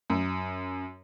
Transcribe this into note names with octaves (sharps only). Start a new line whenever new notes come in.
F#2